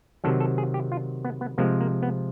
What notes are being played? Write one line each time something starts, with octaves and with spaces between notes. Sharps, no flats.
C3 D#3 F#3 A4
A4
G#4
G4
F4
B3
B3
C3 F3 G#3 A#3
A#3
B3